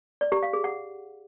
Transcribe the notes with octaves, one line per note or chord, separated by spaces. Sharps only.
D5
G4
F5
G#4
F#5